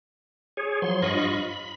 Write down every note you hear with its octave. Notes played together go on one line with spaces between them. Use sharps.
G#4 C#5
F3 F#3 C6
G2 F4 D#5 B5 C#6
B5